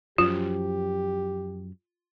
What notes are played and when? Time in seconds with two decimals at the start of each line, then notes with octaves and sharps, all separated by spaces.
0.18 F#2 F3 F4 G4